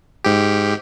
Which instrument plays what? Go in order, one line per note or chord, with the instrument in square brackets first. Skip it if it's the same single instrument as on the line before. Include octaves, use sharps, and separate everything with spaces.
[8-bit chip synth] G#2 G4